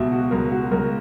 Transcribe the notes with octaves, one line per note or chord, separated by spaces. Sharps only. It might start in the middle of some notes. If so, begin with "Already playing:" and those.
Already playing: C#2 B2 E5
F#4
C#2 A#4
F#4
C#2 A#4